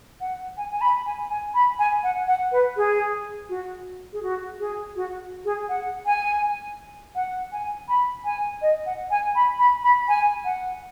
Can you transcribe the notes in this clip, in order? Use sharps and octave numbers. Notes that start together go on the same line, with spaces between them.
F#5
G#5
G#5
B5
G#5
G#5
B5
G#5
F#5
F#5
B4
G#4
F#4
G#4
F#4
G#4
F#4
G#4
F#5
G#5
F#5
G#5
B5
G#5
D#5
F#5
G#5
B5
B5
B5
G#5
F#5